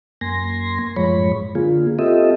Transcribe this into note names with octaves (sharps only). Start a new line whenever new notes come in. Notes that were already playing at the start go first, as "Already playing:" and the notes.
F#2 A#3 G#5 C6 A#6
F#2 A2 F3 G#3 C#5 B5
D3 A#3 F4 G#4
C4 F4 G4 A4 D#5 E5